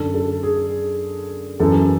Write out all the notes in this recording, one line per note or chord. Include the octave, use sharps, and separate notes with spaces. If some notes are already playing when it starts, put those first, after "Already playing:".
Already playing: F#2 D3 A4
A4
G#4
F#2 E3 A4